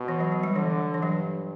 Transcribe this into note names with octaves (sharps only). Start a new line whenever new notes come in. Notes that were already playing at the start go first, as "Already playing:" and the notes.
Already playing: B2
E3
F#3
F#3
G3
D3 E3
E3
G2 F#3